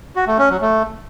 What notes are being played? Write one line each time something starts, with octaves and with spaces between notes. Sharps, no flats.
F#4
A3
C#4
F#3
A3